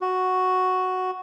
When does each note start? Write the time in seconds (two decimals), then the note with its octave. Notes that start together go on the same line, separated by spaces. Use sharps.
0.01 F#4